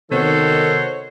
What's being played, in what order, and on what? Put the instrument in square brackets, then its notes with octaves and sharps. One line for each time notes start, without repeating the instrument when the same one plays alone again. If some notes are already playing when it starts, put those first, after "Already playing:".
[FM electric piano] C3 B3 [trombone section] D#3 [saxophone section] F#4 C5 C#5 [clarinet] A4